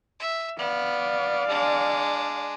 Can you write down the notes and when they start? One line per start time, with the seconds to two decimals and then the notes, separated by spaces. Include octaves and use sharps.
0.20 E5
0.58 B3 D5 F5
1.48 G#3 D4